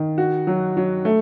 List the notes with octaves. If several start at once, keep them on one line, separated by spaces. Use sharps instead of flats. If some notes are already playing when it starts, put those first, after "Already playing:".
Already playing: D#3
F#4
F#3
F#3
A3